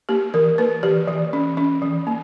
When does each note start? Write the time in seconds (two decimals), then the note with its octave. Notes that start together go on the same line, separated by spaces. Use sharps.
0.09 A#3 G4
0.34 E3 A#4
0.58 A#3 B4
0.83 E3 G4
1.08 E3
1.33 C#4
1.57 C#4
1.82 E3
2.07 A#3